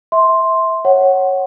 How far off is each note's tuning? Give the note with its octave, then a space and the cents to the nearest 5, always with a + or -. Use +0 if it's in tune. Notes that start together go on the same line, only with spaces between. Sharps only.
E5 -20 C6 +0
C#5 -15 F#5 +15